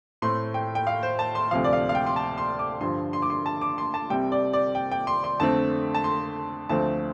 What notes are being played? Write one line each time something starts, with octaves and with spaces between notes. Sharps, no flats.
A2 A3 C4 C6
G5
G5
F5
C5
A5
C6
D2 C3 F3 F5
D5
F5
F5
G5
C6
A5
C6
D6
G2 D3 F3 C6
C6
D6
C6
A5
D6
C6
A5
C2 C3 G3 G5
D5
D5
G5
G5
C6
C6
F2 D3 A3 C4 A5
A5
C6
D2 D3 F3 A3 C4 A5